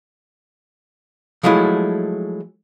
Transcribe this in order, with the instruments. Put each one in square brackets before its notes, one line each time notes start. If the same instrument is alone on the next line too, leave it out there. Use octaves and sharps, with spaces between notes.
[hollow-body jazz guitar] F3 F#3 G#3 A3 E4